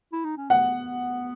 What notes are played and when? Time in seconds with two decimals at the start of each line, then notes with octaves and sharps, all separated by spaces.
0.13 E4
0.25 D#4
0.38 C#4
0.50 B3 F#5